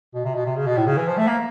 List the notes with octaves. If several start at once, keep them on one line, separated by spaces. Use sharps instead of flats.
B2
C3
B2
C3
C#3
B2
A2
C#3
E3
F3
A3
A#3